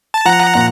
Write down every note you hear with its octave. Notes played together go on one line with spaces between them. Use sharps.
A5
F3 F#5 A#5
A#2